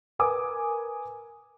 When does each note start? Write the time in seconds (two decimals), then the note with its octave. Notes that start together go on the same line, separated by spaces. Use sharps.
0.19 A#4 B4 G#5 D6 D#6